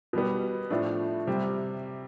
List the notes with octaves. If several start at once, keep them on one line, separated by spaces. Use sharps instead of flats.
B2 G3 B3
A2 F3 A3 D4
C3 G3